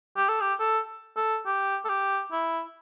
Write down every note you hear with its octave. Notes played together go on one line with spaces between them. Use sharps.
G4
A4
G4
A4
A4
G4
A4
G4
E4